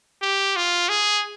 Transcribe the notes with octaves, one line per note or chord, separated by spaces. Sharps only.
G4
F4
G#4